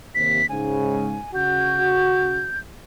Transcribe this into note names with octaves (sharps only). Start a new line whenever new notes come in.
D#2 C3 B6
G#2 C#3 G#5
C#3 F#4 G6